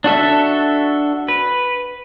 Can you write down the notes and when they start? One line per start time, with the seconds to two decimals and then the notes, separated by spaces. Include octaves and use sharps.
0.04 D4 F#4 A4 E5
1.28 B4